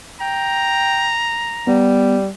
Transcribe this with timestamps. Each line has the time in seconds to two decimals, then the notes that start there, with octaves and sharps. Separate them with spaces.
0.21 G5 A#5
1.67 G3 B3